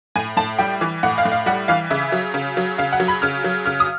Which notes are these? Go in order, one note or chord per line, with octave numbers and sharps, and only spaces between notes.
A2 G#5
A2 A5
G3 G5
E3
A2 F#5
F5
A2
F5
G3 F#5
E3 F5
C#3 E5
F#3
C#3
F#3
C#3 F5
F#5
F#3
B5
C#3 F6
F#3
C#3 F6
D#6